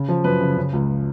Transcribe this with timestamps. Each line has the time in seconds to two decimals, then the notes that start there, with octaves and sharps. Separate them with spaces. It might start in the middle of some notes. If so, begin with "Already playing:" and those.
Already playing: C#3
0.09 F3
0.24 F#2 B4
0.40 C#3
0.57 C#3
0.73 C#2